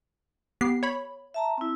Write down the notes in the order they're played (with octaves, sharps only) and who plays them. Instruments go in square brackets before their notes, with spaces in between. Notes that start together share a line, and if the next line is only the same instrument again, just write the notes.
[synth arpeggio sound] B3 G4 C7
C#5 B5
[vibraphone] E5 A5 A#5
C4 E4